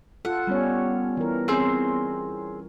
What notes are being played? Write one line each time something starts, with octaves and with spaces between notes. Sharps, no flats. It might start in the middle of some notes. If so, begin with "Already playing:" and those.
F4 A4 F#5
G3 B3 C#4 C#5
E3 A#4
C4 C#4 G#4 C5